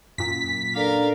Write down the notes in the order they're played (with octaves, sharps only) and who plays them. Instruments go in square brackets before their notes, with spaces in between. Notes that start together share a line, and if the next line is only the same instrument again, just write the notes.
[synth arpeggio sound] F#2 A#2 [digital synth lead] B6
[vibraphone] D4 A4 D5 [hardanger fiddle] A#4 F5